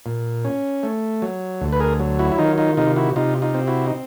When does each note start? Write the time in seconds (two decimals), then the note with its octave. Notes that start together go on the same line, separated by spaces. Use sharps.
0.06 A#2
0.45 C#4
0.83 A3
1.22 F#3
1.61 D2
1.73 B4
1.80 G#4 A#4
2.00 F#3
2.19 E4 F#4
2.32 E4
2.38 D#3 D#4 F4
2.58 D#4 F4
2.77 C3 D#4 F4
2.90 F4
2.96 E4 F#4
3.16 C3 D#4 F4
3.42 D#4 F4
3.54 C4
3.68 E4 F#4
3.86 D#4